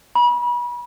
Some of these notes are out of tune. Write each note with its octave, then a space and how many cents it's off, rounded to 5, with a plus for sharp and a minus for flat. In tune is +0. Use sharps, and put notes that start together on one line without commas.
B5 -35